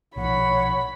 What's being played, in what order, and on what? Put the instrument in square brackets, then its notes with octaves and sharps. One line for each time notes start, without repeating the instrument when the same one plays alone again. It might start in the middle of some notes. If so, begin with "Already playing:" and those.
[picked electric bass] B1 A#2 F3 [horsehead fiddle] C#5 F#5 [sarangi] B5